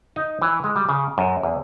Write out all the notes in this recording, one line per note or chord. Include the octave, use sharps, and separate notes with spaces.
D#4
E3
G#3
G3
C#3
F#2
E2